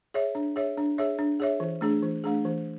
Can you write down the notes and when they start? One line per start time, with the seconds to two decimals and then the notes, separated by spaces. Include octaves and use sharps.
0.14 G#4 C#5 E5
0.35 D4
0.56 G#4 C#5 E5
0.77 D4
0.98 G#4 C#5 E5
1.19 D4
1.40 G#4 C#5 E5
1.60 E3
1.81 A3 D4 G#4
2.03 E3
2.24 A3 D4 G#4
2.45 E3